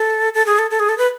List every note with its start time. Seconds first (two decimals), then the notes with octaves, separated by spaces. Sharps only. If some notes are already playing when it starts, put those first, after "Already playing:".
Already playing: A4
0.34 A4
0.46 G#4
0.59 A4
0.70 A4
0.79 G#4
0.89 A4
0.98 B4